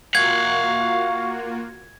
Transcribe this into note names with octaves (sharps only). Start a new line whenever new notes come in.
A#3 F4 F#4 F5 F#5 C#6 G#6